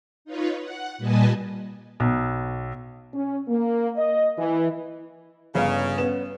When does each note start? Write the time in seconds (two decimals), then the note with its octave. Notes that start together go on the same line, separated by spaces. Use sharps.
0.25 D#4 F4 B4 C#5
0.58 F#5
0.98 A#2 G3 B4 D#5 G#5 A5
2.00 B1
3.14 C#4
3.48 A#3
3.96 D#5
4.38 E3
5.55 G1 C#3 C#5 F5
5.98 B3 C#4 B4 E7